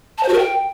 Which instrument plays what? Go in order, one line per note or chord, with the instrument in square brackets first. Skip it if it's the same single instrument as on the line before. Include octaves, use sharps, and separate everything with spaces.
[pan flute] A5
C5
F#4
A#4
G5